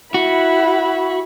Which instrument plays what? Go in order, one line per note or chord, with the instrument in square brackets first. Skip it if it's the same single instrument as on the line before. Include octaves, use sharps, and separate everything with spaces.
[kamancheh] E4 B5 [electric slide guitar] F#4